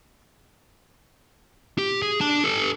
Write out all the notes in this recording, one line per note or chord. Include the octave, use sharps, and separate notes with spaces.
G4
G#4
D4 A5
G4 A4